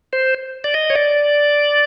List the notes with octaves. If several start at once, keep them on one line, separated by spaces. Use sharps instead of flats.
C5
D5
D#5
C#5
D5